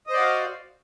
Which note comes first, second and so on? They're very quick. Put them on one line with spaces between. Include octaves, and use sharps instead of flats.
D#5 C5 D5 F#4 F5